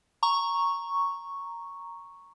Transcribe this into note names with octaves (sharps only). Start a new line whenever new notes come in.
A#5 C#6